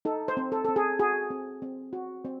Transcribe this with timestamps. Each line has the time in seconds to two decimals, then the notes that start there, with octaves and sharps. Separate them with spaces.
0.05 D#4 A4
0.28 C5
0.37 C4
0.52 A4
0.65 C4 A4
0.76 G#4
0.99 F#4 G#4
1.30 C4
1.62 C4
1.93 F#4
2.25 C4